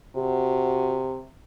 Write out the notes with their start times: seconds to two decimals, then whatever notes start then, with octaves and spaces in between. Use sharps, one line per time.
0.16 C3 F#4